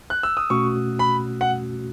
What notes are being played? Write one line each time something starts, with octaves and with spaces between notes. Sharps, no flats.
F#6
E6
D#6
B2 A3 C#4 F#4 C#6
B5
F#5